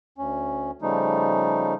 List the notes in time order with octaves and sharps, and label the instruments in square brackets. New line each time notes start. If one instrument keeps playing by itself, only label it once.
[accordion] D2 C#4
C#3 F3 G3 A3 D#4